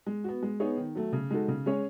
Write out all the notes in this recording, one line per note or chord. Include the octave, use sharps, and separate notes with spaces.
G#3
B3 F#4
G#3
B3 D#4 G#4 C#5
D#3
F#3 A3
C#3
G#3 D#4 F#4 A4
C#3
G#3 C#4 G#4 C#5